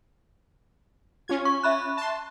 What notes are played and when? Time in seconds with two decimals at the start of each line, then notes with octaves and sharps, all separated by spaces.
1.28 C#4 F4 G#6
1.45 C#6
1.63 E5 B5 F#6
1.97 A5 C6